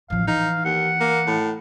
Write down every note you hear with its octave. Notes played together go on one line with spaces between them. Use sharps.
A1 F3 F5
E3 D#4 F5
D#2 F#5
A#3
A2